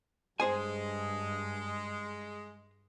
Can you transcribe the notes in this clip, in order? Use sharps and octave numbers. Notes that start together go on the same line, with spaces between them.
G2 G#3 G#4 C5 G#5